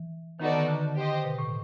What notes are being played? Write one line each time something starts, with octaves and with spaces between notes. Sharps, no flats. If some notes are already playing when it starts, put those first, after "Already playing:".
Already playing: E3
D#3 B3 D#4 F#4 A4 D5
D3
D3
G4 C5 D#5
B2
A2